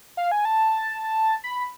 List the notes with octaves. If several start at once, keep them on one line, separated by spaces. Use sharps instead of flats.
F5
G#5
A5
B5